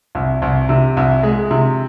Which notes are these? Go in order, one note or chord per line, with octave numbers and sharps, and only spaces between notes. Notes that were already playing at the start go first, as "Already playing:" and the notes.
C2
C2
C3
C2
G#3
C3